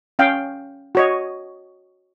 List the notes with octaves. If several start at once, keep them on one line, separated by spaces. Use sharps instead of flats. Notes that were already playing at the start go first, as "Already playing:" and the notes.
C#4 F5 G5
F#4 C#5 D#5